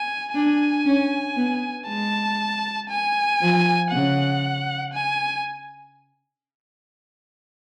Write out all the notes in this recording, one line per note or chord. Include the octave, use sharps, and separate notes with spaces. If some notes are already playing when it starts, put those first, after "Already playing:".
Already playing: G#5
D4 G#5
C#4
B3
G#3 A5
G#5
F3
C#3 F#5
G#5